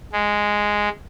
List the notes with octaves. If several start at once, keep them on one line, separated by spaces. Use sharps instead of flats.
G#3